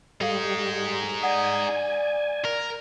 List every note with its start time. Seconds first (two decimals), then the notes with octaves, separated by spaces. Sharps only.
0.21 G3 D#4 G#4 A4 F5
1.22 D5 F#5 G#5 D#6
2.45 A#4